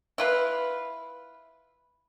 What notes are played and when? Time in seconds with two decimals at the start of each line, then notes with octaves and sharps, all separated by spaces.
0.18 E4 F4 B4